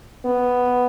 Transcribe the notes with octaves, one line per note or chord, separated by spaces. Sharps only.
B3